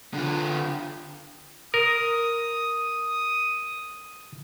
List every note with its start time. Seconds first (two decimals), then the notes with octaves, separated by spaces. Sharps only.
0.14 D3 F4
1.74 A#4 D#6